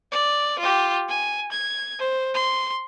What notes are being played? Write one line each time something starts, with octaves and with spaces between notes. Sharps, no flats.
D5
F4 G4
G#5
G#6
C5
C6